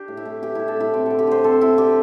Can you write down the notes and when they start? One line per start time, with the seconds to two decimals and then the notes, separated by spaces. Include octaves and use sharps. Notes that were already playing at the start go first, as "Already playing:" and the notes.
Already playing: D4 G4
0.08 A2
0.17 E4
0.25 A3
0.42 E3 G4
0.55 D4 E4
0.68 A4
0.76 A2 E4
0.93 C4 G4
1.06 D3 A4
1.19 G4
1.27 D3 C5
1.44 C4 A4
1.61 C4 E4
1.78 D3 G4